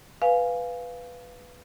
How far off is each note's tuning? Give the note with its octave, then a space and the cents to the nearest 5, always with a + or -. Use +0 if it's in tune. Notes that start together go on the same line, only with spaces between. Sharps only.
B4 +0 F5 +0 G#5 +0